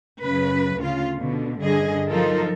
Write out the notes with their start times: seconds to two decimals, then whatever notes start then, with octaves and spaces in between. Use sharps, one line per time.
0.21 F#2 C#3 B4
0.77 D2 C#3 F4
1.17 B2 D3
1.60 G2 D3 G#4 D#5
2.10 F3 F#3 D#4 F4 A4 A#4